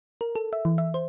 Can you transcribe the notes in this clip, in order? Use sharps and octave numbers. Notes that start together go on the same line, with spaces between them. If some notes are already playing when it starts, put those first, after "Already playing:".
A#4
A4
E5
E3
E5
C5